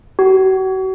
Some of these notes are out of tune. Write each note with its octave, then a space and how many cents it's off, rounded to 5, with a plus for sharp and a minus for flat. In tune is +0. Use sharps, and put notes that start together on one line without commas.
F#4 +40